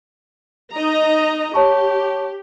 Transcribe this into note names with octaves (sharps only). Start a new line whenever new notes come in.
D#4 D#5 A#5
G4 C#5 A5 C#6